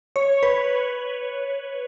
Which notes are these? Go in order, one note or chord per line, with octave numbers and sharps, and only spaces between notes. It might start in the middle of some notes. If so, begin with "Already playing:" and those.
C#5
B4